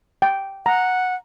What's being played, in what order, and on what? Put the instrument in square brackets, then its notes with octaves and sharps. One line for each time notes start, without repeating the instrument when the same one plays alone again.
[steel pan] G5
[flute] F#5 [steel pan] A#5